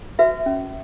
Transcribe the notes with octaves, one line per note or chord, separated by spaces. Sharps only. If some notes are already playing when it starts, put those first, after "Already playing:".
F#4 B4 E5
C#4